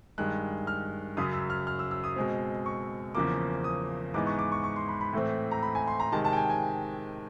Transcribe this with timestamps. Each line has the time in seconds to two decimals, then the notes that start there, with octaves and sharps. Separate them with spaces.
0.18 G2 D#3 G#3 F#6
0.67 F6
1.17 F#2 C#3 F#3 D#6
1.33 E6
1.50 F6
1.67 F6
1.79 E6
1.91 E6
2.04 D#6
2.16 B2 G#3 C4
2.66 C#6
3.15 E2 C#3 F3 A#3 D6
3.64 D#6
4.14 G#2 E3 G#3 B3 D6
4.27 C#6
4.39 D6
4.52 C#6
4.64 C#6
4.76 C6
4.88 B5
5.01 B5
5.13 A2 E3 A3 C4
5.51 A#5
5.63 B5
5.75 G#5
5.88 C6
6.00 A#5
6.12 C3 D#3 G#3 A5
6.25 A5
6.33 G5
6.37 G#5
6.50 G#5